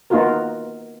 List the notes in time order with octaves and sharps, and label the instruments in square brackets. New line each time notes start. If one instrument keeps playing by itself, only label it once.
[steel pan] A#3 B3 D#4 F4 F#4 A#4